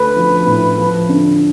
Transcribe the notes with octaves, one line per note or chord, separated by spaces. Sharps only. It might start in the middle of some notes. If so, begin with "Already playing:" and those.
Already playing: D2 A3 B4
F3
A2
F3
D3